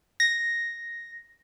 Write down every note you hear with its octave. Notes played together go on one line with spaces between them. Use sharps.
A#6